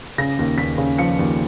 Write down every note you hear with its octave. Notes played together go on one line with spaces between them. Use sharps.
C#3 A#6
D#2
D#2 B6
C#3
F3 C#7
D#2